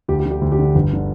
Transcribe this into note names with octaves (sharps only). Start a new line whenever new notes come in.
D2 G4
G4
D3
G4
D2
G4
D3
G1
D3